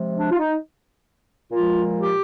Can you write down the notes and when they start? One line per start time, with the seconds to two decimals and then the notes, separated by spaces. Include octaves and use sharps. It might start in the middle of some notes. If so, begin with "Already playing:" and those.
Already playing: C3 F3 G#3
0.15 D4
0.31 F4
0.38 D#4
1.51 A#2 F3 G#3 F4
1.97 G4